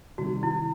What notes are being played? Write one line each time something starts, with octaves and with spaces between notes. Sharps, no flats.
C3 D#3 G3 F#4
E4